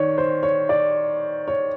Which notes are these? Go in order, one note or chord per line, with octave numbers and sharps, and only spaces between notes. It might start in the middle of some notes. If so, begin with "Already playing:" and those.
Already playing: D#3 C#5 D5
C5
C#5
D5
C#5